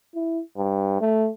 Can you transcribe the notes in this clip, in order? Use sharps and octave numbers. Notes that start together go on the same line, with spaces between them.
E4
G2
A3